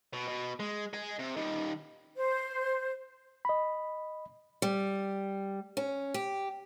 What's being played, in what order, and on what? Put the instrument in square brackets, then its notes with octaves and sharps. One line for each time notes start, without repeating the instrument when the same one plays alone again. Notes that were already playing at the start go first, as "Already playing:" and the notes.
[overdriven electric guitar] B2
B2
G#3
D#5 G#5
C3
D#3 G3
[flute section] C5
[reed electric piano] D#5 B5
[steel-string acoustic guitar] G3
C#4
G4